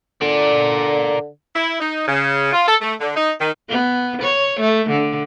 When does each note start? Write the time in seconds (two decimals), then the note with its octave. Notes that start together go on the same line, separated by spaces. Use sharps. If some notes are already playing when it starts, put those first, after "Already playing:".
0.22 D3 A#4 D5
1.55 E4
1.80 D#4
2.07 C#3
2.53 F4
2.67 A4
2.81 A3
3.00 D3
3.16 D#4
3.40 D#3
3.69 B3
4.22 C#5
4.60 A3
4.90 D3